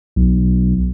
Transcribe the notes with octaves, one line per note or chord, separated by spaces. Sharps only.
B1